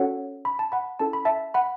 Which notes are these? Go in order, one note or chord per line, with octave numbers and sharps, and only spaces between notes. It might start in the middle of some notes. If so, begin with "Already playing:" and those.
Already playing: C#4 F#4 A4 C#5 F#5
B5
A5
F#5 B5
C#4 E4 A4 A5
B5
E5 A5
F#5 B5